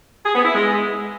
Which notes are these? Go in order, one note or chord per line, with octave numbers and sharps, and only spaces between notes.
G#4
B3
E4
G#3